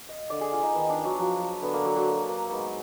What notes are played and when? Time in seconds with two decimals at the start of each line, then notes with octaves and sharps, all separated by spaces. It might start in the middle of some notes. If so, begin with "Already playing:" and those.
Already playing: F5
0.09 D#5
0.30 D3 D5
0.41 G#4
0.53 F4
0.63 D#4
0.74 D#3 B3
0.89 D4
1.05 F#3
1.19 F3 F#3
1.62 D3 B3
1.73 A#3
1.85 F#3
1.96 F#3
2.08 A#3
2.29 A#3
2.51 G#2 B3